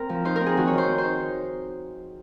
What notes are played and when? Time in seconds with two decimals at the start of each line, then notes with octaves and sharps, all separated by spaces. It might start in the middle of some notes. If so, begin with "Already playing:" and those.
Already playing: C4 A#4
0.09 F3
0.25 D#4 C5
0.36 C4 A#4
0.46 G#4
0.57 D#3 F#4
0.67 C#5
0.73 D#3
0.78 C5
0.89 C4
0.98 C5
1.04 D#4